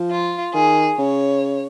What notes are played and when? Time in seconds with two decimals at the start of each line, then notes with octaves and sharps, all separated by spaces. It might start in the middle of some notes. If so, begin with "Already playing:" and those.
Already playing: F3
0.11 F4
0.54 D#3 G#4
0.98 C#3 C#5